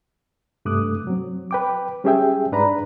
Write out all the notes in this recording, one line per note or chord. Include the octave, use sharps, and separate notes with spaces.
G2 C3 A3 D6 D#6 F#6
F#3 C4
B4 G5 D6
G3 C#4 G4 G#4 E5 G5
G#2 D4 B4 D5 A#5 B5